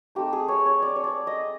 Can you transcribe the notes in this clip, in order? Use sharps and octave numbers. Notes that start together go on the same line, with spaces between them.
A3 C4 D#4 G4
G#4
C#5
C#5
D5
C#5
D5
D#5